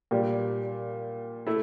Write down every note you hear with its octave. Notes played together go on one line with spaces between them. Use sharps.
A#2 G3 D4 G4
A3 E4